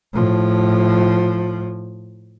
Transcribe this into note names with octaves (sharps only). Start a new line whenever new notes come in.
A2 F3